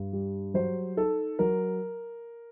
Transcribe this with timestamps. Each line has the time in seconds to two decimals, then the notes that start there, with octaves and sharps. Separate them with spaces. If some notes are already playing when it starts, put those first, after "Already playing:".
Already playing: G2
0.13 G3
0.54 F#3 C5
0.97 D#4 A4
1.39 F#3 A#4